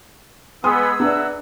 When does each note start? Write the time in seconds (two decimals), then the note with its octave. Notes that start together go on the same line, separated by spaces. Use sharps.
0.64 G#3 B3 G#4 G#5 C6 D#6 E6
1.00 D4 B4 D5 E5 F#5 A#5